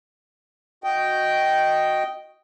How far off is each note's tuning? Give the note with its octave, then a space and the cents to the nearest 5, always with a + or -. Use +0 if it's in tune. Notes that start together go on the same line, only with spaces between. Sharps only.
F#4 -10 D#5 +0 G5 -10